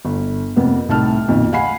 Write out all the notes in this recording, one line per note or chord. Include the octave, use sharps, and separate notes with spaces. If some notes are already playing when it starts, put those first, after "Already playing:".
G1
F2 C3 A#3 B3
C2 A2 D#4 A5 F6
B1 F2 A#2 D#3
F5 F#5 G#5 B5 C7